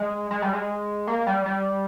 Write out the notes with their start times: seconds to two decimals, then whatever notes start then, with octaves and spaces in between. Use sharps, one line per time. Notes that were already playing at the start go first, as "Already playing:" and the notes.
Already playing: G#3
0.31 G#3
0.42 G3
0.53 G#3
1.07 A#3
1.27 G3
1.46 G3